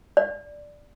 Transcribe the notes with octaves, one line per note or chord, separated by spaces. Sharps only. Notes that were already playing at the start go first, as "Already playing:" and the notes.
D5